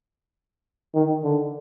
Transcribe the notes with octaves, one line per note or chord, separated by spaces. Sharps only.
D#3
D3